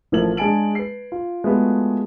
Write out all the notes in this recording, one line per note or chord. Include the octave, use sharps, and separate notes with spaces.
A1 F3 A3 A#4 G#6 F#7
G#3 D4 G#5 A5 D7 F#7
B4 C7
F4
G#3 A3 B3 F4 F#4